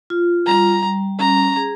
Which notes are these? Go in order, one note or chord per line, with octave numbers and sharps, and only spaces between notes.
F4
G3 A#5
G3
C#4 A#5
G#4